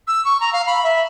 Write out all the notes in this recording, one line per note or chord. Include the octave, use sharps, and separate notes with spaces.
E6
C#6
A#5
F5
B5
E5